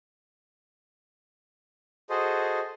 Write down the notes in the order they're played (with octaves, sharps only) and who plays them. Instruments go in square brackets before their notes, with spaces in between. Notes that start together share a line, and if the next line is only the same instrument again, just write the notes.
[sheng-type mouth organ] F#4 G#4 A4 C5 D#5